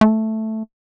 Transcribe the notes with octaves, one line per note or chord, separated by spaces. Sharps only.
A3